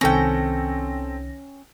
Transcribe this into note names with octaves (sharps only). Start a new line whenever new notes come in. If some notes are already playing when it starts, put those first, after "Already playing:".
C2 D#3 C4 C#4 A4 G5 A#6